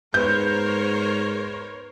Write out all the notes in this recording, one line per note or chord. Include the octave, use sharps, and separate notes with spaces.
G#2 B3 A#4 C5 C#5 G6